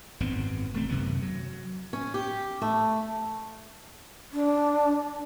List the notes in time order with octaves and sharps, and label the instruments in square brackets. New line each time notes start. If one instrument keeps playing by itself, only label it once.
[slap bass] G#1 F#2 B3 C4
E1 A3 C4
F#2 C3 D#3 B3
F#3
[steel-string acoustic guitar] C#4
G4
A3
[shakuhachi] D4